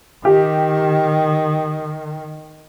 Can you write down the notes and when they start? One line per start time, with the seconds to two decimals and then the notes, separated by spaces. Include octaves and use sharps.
0.25 D#3 G4